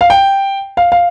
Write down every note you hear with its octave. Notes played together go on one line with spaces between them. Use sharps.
F5
G5
F5
F5